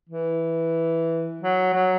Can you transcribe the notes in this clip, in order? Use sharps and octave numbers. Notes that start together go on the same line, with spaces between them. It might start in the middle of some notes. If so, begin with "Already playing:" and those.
E3
F#3
F#3